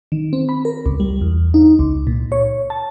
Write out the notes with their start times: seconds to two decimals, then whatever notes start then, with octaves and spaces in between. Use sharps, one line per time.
0.12 D#3
0.33 C4
0.49 B5
0.65 A#4
0.86 C#2
1.00 G3
1.21 E2
1.54 D#4
1.79 C#2
2.07 A#2
2.32 C#5
2.70 A5